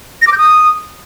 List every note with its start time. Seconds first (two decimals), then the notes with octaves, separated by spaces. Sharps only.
0.22 A#6
0.27 D6
0.32 G6
0.38 D#6